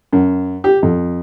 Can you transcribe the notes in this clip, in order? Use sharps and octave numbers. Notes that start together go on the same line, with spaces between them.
F#2
G4
F2